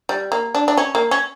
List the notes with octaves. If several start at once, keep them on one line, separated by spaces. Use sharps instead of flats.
G3
A#3
D4
D4
C#4
A#3
C#4